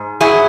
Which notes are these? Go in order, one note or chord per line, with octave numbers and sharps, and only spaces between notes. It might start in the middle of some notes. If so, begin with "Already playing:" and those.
Already playing: G#2
F#3 E4 G#4